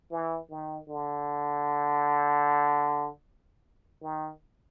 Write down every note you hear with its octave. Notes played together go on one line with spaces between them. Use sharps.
E3
D#3
D3
D#3